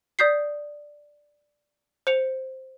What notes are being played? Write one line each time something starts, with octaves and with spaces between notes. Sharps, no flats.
D5 D#6 G6 B6 C7
C5 C#7 F7